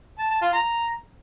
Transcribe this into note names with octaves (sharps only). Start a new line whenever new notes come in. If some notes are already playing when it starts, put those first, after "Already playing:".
A5
A5
F4
A#5